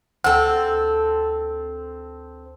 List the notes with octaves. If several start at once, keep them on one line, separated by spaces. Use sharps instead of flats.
D2 C4 A4 G5